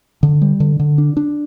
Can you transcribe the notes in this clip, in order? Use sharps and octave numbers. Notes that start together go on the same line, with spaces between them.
D3
G3
D3
D3
D4
D4